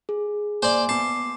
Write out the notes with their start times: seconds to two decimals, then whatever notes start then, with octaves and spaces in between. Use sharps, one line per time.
0.09 G#4
0.63 A#3 C5 D5 G#5 D6
0.89 B3 A5 D6 C7